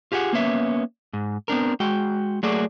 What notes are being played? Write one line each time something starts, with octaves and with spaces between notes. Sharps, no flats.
F4 G4 G#4 D#5 F#5
A#3 B3 C#4 E5
G#2
B3 C4 D4 A#4
G#3 F#4 G5
F#3 A3 A#3 F#4 G#4 D5